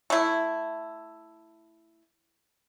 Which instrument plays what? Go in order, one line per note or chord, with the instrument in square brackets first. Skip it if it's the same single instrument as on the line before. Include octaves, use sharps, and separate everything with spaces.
[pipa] A3 E4